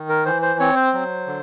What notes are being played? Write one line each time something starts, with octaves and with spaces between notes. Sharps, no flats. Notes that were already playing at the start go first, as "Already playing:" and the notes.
Already playing: D#3
A#4
E3 C5
C5
C4 C#5
C5
F#3
D3